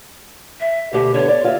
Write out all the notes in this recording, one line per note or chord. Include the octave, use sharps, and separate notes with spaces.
E5
D2 B2 G4
D3 B3 C#5
D5
F4 F#4 E5